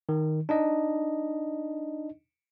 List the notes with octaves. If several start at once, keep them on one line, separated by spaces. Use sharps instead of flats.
D#3
D4 D#4 D#5